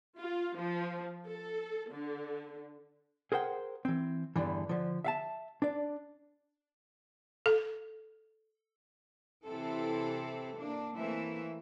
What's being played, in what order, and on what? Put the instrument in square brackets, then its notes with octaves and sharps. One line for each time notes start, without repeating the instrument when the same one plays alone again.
[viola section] F4
F3
A4
D3
[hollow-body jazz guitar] G#4 A#4 C5 F#5 G5
E3 C4
E2 G2 D3 E3
D3 F3
E5 F5 A5
D4 D5
[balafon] A4
[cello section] C3 E3 C4 E4 A4
A#3 D4
E3 A3 A#3 C4 E5